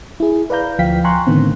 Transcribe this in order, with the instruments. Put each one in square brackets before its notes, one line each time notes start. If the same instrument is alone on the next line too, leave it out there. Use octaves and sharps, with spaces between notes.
[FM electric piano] E4 G#4
B4 D5 F5 A#5 G6
D2 F3 F5 G5 B6
G5 G#5 A#5 C6 C#6 F#6
A2 D3 D#3 B3 C4